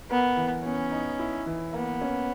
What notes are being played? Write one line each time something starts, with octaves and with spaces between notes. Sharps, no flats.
B3 A#4
E3
B3 C#4
D#4
E4
E3
A#3 B3
C#4